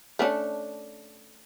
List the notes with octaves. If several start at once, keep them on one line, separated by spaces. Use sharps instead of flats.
A3 C#4 D4